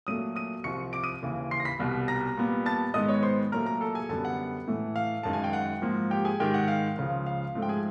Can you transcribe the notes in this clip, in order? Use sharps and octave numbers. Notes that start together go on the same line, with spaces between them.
A#2 F#3 A3 D#6 D#7
D#6 D#7
C2 C3 F3 C#6 C#7
D6 D7
D#6 D#7
D#2 C#3 E3
C6 C7
A#6
B5 B6
C2 B2 G3
A#5 A#6
A#2 G3 B3
A5 A6
G#2 D#3 G#3 B3 D#5 D#6
C#5 C#6
C5 C6
A#2 F#3 A3 A#4 A#5
A#4 A#5
A4 A5
G#4 G#5
F#2 D3 G3 B3 A4 A5
F#5
A2 E3 A3
F5
F#2 D#3 G#3 A5
G#5
G5
F#5
G#2 F3 A#3
G4 G5
G#4 G#5
G#2 D#3 G#3 G4 G5
F#5
F5
C#2 C#3 F3 F5
F5
G#2 F3 A3
G5
G#4 G#5